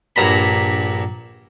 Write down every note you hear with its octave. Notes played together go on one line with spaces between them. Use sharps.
A#1 G2 A#5 B5